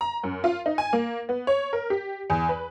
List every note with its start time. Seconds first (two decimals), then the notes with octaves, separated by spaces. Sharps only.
0.01 A#5
0.23 F#2
0.44 F4
0.66 D#4
0.78 G#5
0.93 A#3
1.29 B3
1.47 C#5
1.73 A#4
1.90 G4
2.30 E2
2.49 B4